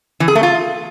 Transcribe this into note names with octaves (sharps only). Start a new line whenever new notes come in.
E3
G#4
A3
F4